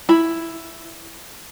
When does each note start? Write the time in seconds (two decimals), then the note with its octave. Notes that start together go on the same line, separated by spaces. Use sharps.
0.09 E4 B5